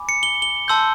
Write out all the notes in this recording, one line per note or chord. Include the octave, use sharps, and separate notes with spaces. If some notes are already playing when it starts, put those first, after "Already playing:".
Already playing: G#5 B5 D6
C#7
G7
G7
A5 C6 E6 G6